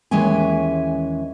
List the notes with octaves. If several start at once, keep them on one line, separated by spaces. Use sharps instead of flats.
D#2 E3 G#3 C#4 E5 G#5